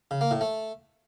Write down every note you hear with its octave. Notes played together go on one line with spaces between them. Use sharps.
C#3
A#3
A2
A3